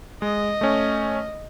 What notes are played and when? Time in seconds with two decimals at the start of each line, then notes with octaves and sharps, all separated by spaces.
0.22 G#3 D#5
0.61 A3 C#4